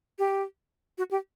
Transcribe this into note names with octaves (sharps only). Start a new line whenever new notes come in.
G4
F#4
G4